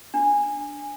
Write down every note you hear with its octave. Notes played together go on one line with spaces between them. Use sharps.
D4